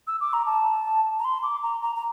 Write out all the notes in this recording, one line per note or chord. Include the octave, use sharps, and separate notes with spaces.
E6
D6
A#5
A5
A#5
C6
D6
A#5
A#5
A#5